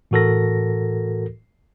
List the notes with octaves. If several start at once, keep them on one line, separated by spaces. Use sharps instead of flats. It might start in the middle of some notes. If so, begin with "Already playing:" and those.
A2 E3 F#4 A4 A#4 A#6